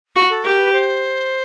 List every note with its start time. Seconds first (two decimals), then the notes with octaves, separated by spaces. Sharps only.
0.16 F#4
0.30 A4
0.44 G4 A#4
0.59 B4
0.73 C5